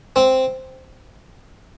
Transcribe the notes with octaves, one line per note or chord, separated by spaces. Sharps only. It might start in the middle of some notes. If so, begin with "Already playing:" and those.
C4